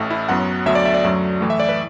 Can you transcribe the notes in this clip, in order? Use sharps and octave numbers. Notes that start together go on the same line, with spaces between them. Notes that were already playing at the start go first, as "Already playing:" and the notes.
Already playing: A1 A2 A3
E4
F#2 F#3 B3 F#5
D2 D3 F#3 B3 E5
D5
E5
D5
F#2 F#3 A3
A2 E3 A3
E5
D5
B4